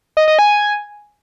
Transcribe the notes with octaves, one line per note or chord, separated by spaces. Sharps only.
D#5
D#5
G#5